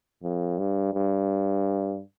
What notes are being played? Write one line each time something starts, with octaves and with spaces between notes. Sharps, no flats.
F2
G2
G2